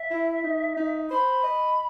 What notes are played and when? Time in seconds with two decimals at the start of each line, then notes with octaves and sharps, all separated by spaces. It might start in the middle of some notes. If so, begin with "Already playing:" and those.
Already playing: E5
0.11 E4
0.44 D#4
0.77 D#4
1.10 C5 B5
1.43 D#5